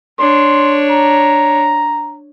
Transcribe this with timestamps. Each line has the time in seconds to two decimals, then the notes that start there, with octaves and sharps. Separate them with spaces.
0.19 D4 C#5 C6
0.90 A#5